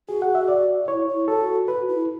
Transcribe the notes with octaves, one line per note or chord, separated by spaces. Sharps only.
F#4 G#4
F#5
E5
D5
E4 C#5
E4
F#4 A4
F#4 B4
E4